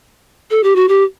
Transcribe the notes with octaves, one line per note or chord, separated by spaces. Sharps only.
A4
G4
F#4
G4